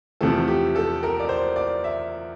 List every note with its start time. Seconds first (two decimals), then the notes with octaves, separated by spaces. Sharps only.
0.21 E2 C3 F3 A3 A4
0.48 G4
0.76 A4
1.03 A#4
1.20 D5
1.29 C5
1.56 D5
1.84 E5